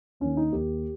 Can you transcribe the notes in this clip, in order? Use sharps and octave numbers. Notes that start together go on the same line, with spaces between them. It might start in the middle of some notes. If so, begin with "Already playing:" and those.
D#2 D#3 C#4
D#4
D#2 D#3 G4